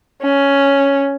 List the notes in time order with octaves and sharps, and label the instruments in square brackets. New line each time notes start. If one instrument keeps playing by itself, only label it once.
[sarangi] C#4